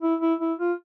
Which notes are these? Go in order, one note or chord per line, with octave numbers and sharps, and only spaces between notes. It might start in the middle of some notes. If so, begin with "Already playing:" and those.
E4
E4
E4
F4